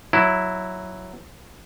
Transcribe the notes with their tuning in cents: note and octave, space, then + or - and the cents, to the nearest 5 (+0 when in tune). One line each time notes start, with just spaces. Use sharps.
F#3 +0 E4 +0